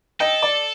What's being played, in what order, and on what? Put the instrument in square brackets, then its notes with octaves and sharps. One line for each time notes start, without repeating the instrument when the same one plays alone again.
[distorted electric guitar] A4 [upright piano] D#5 G5
[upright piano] D5